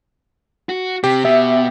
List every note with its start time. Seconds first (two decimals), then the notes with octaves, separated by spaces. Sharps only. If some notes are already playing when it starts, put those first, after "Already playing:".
0.69 F#4
1.04 C3 G4
1.25 B2 E5